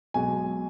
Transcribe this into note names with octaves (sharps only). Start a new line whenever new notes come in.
B1 B2 G#3 G#5